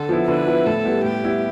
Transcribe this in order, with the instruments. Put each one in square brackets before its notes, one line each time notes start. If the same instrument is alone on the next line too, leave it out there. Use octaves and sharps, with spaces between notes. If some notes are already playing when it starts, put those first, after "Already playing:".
Already playing: [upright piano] D3 [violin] A4
[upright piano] F3 B3 E4
[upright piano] D3 [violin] B4
[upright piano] F3 B3 E4
[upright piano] A2 [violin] A4
[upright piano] G3 B3 E4
[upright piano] A2 [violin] G4
[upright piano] G3 B3 E4